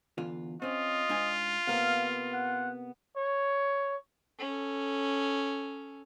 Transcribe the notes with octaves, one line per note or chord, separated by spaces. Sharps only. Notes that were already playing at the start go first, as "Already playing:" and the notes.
E2 D3 F4
C4 C#4 F4 D#5
G#2 D4 G#5
C3 A#3 B3 F5
F#5
C#5
C#4 A4